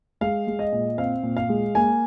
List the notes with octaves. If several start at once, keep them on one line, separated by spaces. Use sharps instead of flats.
G#3 F5
G#3
D#5
A#2
C4 F5
A#2
F5
G#3
A#3 G#5